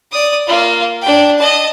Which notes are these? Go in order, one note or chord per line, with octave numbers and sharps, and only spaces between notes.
D5 D#6
A#3 F4
D4 G5
D#5 A5